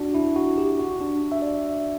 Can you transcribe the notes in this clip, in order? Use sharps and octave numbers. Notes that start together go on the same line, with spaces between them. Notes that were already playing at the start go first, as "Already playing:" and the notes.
Already playing: D4 F#4
E4
F#4
G4
F#4
D4
E5
D5